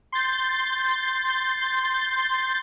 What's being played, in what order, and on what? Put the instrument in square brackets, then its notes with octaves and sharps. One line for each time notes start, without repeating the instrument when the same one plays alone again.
[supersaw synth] C6 G6 A6